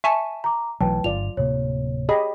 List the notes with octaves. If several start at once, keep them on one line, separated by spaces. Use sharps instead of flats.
E5 G#5 A5 C#6
A#5 D6
B1 E3 F#3 A3 B4 G5 A5
G1 F4 D5 F7
D1 C3 A#3 C#5
G4 G#4 D#5 B5